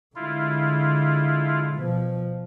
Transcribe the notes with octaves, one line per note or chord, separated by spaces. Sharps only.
D3 G#3 E4 F4
B2 F3